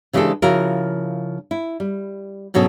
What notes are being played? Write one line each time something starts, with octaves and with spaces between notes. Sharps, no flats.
C#3 E3 G#3 D4 G4 A4
C#3 F3 E4 F#4 A#4
E4
G3
G#2 B2 F#3 C#4 A4